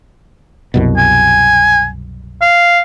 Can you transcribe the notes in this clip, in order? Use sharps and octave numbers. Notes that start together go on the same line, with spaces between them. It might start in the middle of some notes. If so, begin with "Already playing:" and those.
C2 F#2 B2
G#5
F5